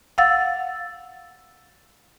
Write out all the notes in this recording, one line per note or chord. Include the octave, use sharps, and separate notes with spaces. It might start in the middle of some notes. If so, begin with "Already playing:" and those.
F5 F#5 E6 A6